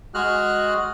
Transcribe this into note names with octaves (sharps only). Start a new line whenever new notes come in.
G#3 F#4 G#4 F6 F#6